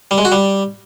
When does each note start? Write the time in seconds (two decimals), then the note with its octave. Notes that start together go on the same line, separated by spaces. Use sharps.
0.11 G3
0.18 G#3
0.25 F#4
0.32 G3